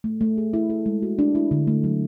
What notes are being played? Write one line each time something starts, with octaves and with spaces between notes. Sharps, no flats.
A3
A3
G#4
E4
A4
G#3
F#4
D4
E4
D3
A3
F#3